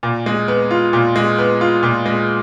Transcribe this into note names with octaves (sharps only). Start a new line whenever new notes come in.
A#2
G#3
B3
F4
A#2
G#3
B3
F4
A#2
G#3